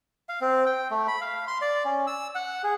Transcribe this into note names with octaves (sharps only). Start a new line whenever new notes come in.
F5
C4
G5
A3
B5
F5
C6
D5
C#4
E6
F#5
G#4